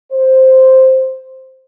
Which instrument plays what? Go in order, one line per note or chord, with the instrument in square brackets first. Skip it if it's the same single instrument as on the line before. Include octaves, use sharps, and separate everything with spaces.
[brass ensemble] C5